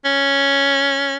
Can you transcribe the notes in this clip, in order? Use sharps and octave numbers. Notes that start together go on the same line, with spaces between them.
C#4